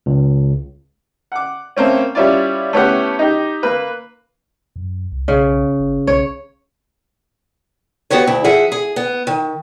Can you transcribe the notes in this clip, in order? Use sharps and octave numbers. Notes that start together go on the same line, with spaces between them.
C#2
F#5 D6
A3 A#3 C4 C#4
G3 C#4 E4 F4 D5
A3 B3 C#4 E4 G4 F#5
D#4 G4
A#3 B4
F#2
C2
B1 C#3
G1
B1 C#5
B3 F#4 G4 B4 C#5
D2 E4
F3 G#4 E5 F#5
G#4
B3
D#3